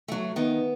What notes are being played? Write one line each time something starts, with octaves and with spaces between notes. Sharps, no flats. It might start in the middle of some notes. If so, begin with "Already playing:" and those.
F#3 A3
D#3 B3